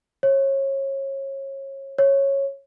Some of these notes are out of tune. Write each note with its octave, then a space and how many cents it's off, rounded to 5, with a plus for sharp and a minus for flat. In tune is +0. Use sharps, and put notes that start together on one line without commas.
C#5 -30
C#5 -10